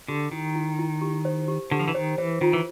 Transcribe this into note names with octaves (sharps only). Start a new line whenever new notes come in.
D3 G4
D#3 E4
E4
E4
G4
C5
G4
D3 G4
F3
E3
D#3 C5
E3 C5
D#3 F4
E3